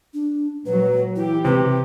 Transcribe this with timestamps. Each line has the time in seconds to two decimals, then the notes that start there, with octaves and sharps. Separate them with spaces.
0.14 D4
0.66 A#2 F#3 B4
1.16 E3 E4 G4
1.45 C3 B4